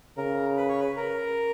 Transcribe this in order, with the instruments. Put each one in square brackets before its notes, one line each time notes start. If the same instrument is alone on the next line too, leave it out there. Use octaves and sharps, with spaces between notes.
[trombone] C#3 [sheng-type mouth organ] A#4
[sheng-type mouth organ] B4
C#5
B4
A#4